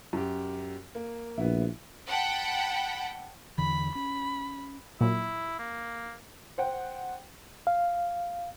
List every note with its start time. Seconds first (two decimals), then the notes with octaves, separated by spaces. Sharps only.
0.13 F#2 G4
0.95 A#3
1.38 A#1 B3 E4
2.07 F#5 G5 A5 B5
3.58 E2 D3 E3 B5
3.95 C#4 B5
5.01 A#2 F#3 E4
5.59 A#3
6.58 C5 F#5 G5
7.67 F5